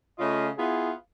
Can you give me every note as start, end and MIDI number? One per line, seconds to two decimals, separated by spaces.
0.19 0.49 49
0.19 0.49 57
0.19 0.49 61
0.19 0.49 65
0.19 0.49 75
0.58 0.92 59
0.58 0.92 64
0.58 0.92 65
0.58 0.92 68